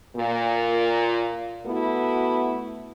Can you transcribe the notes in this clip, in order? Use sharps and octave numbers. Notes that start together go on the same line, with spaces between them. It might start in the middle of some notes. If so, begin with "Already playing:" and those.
A#2
A3 B3 E4 F#4